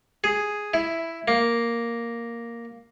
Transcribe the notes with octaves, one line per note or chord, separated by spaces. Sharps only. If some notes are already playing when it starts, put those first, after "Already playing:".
G#4
E4
A#3